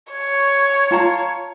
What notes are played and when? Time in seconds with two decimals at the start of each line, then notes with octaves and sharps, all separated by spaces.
0.13 C#5
0.91 F4 A5 A#5